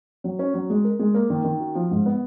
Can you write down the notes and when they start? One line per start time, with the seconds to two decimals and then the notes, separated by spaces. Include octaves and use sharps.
0.24 F#3
0.39 C#4
0.54 F#3
0.70 G#3
0.84 A#4
0.99 G#3
1.14 A#3
1.30 D#3
1.44 D#3
1.60 F#4
1.75 F3
1.91 G#2
2.06 B3